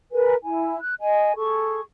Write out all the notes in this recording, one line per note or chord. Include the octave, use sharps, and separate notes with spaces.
G#4 A#4 B4 G#5
E4 G#5
F#6
D#5 G#5
G#4 A4 C#6